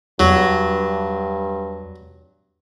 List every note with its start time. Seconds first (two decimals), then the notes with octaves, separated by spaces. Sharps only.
0.20 E2 G2 F#3